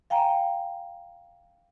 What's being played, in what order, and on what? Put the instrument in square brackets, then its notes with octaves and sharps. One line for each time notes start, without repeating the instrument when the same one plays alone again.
[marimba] F5 G5 G#5 A#5